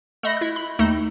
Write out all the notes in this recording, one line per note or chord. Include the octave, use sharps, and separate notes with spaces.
A3 D#5 B5 A#6
E4 F#6
B5
D#2 A3 D#4